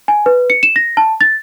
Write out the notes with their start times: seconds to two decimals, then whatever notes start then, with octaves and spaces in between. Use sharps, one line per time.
0.08 G#5
0.26 B4
0.50 C#7
0.63 E7
0.76 A#6
0.97 A5
1.21 A6